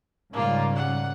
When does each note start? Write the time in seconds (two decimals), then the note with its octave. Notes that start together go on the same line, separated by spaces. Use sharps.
0.33 G#2 C#3 G3 A#3 F4
0.76 F#5